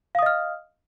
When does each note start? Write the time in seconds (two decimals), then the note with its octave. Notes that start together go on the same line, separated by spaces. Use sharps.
0.15 F5
0.19 D#6
0.22 D#5
0.26 F6